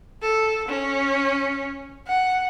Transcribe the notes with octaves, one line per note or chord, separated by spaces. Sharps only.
A4
C#4
F#5